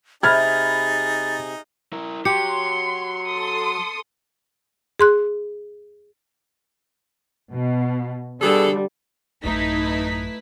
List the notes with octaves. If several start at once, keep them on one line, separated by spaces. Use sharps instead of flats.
C3 D#4 G#4 B5 F6 G#6 A6
E4 A#4
F#3 G4 C6 C#7
A4 C6 D#6
G#4 C6 F#6
B2
B2 D3 G3 G#4 A4
A1 F#2 A3 D#4 E4 B4 B6